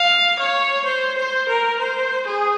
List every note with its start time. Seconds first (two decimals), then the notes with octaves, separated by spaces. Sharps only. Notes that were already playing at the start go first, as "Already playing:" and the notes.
Already playing: F5
0.39 C#5
0.85 C5
1.17 C5
1.48 A#4
1.79 C5
2.26 G#4